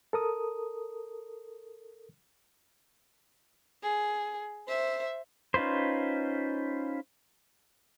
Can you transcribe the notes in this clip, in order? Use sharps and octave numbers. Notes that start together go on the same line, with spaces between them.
A4 A#4 D#6
G#4
C5 E5
C#4 D#4 F4 B4 C5